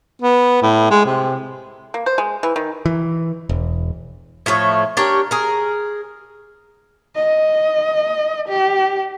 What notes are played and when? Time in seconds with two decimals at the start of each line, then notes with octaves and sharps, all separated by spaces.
0.22 B3
0.62 A2
0.91 G#3
1.06 C3
1.94 A#3
2.06 C5
2.18 G#3
2.43 E3
2.56 D#3
2.86 E3
3.49 E1
4.46 A2 F3 A3 C#5
4.97 D4 G4 A#4 C#5
5.31 G#4 A#4
7.16 D#5
8.48 G4